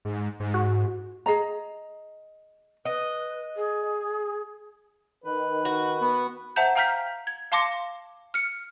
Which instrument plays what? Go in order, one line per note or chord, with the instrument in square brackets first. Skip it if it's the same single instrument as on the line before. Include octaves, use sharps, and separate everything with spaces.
[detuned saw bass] G#2
G#2
[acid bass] F#4
[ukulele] G#4 D#5 A#5
[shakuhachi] B4 [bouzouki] D#5
[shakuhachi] G#4
[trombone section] D#3 [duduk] B4
[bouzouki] F#4
[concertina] B3
[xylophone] C5 E5 F#5 A5 A#5 G6
F5 G5 A#5 F6 G6 B6
G#6
F5 A5 C6 D6 A#6 C#7
F6 C#7